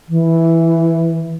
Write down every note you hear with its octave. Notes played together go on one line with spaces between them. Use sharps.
E3